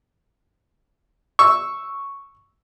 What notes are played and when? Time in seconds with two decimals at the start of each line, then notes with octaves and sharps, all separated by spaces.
1.39 C#6 E6